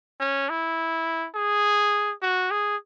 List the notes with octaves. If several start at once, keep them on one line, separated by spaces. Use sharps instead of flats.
C#4
E4
G#4
F#4
G#4